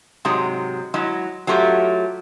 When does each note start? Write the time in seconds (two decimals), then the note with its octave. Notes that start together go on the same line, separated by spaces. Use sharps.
0.25 G#2 C3 F#3 G#3
0.94 F#3 G#3 E4 D#5
1.47 F#3 A3 F4 G4